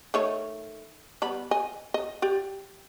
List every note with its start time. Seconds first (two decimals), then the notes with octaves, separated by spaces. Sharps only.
0.14 D#3 A3 C#5
1.22 G3 B3 B5
1.51 D#5 G#5
1.94 D#5
2.22 G4 D5